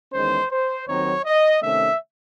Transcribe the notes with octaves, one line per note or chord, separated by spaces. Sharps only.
E2 D#3 G#3 C#4 C5
C5
D#2 D#3 F#3 C4 D#4 C#5
D#5
C3 D#3 A3 C#4 E5